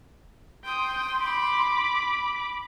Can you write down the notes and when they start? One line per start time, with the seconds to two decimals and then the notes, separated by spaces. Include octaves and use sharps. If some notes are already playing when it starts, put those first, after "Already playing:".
0.65 G5 C6 D#6
1.21 B5 D6